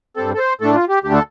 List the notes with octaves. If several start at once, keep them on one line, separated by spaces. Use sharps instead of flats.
G2 G3 C4 A4
A4
C5
A2 A3 D4 A4
F4
G4
D2 D3 A3 D4 G4
A4